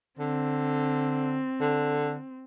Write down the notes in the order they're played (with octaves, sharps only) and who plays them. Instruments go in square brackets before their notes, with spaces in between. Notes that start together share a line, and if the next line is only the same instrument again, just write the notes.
[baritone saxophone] D3 [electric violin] C4
[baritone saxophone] D3